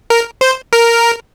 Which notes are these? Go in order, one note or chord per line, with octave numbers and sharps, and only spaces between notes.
A#4
C5
A#4